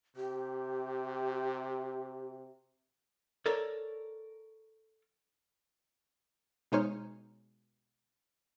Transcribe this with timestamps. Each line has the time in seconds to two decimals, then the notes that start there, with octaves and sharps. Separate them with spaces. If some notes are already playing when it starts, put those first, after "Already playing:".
0.16 C3 G4
3.46 A4 A#4 C#5 D5
6.72 B2 G#3 D#4 C5 C#5 F6